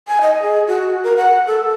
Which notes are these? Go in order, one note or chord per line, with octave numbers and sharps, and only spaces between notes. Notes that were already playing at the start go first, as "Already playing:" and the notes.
G#5
D#5
G#4
F#4
A#4
F#5
A4